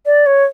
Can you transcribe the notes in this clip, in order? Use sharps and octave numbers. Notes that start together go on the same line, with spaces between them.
D5
C#5